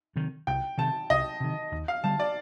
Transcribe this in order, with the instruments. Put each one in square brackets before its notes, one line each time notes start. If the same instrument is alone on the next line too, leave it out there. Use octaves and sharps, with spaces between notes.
[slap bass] C3 D#3
[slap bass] C2 [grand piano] G5
[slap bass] C3 D#3 [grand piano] A5
[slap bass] C2 [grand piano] D#5
[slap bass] C3 D#3
D#2
[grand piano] F5
[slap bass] D3 G3 [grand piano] A5
[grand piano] D5